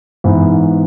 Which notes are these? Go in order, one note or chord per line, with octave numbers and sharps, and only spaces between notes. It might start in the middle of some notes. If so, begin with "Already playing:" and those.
G#2 E3 B3